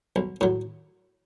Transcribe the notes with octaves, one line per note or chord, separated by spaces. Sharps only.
B1
A2 F#3